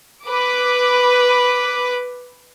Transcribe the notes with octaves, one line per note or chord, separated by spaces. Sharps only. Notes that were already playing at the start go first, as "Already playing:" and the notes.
B4 D6